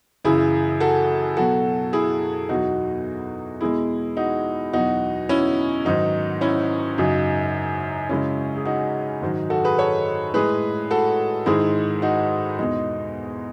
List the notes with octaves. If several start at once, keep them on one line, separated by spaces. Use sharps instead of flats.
F#2 C#3 E3 E4 G#4
F#4 A4
B2 F#3 F#4 A4
E4 G#4
E2 B2 F#3 D#4 F#4
E2 B2 G#3 E4 G#4
D#4 F#4
E2 B2 F#3 D#4 F#4
C#4 E4
G#2 D#3 F#3 D#4
C#4 E4
F#2 C#3 F#3 D#4
F#2 C#3 G#3 C#4 E4
G#4
D#4 F#4
G#2 D#3 F#3
F#4 A4
G#4 B4
A4 C#5
A2 G#3 G#4 B4
F#4 A4
G#2 D#3 G#3 E4 G#4
D#4 F#4
E2 B2 G#3 D#4